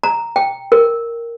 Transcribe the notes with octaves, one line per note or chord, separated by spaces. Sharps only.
A#5
G5
A#4